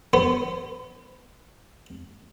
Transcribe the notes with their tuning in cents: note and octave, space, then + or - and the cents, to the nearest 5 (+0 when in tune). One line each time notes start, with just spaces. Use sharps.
B3 +0 C5 -45